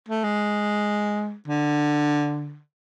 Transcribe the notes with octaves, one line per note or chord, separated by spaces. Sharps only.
A3
G#3
D3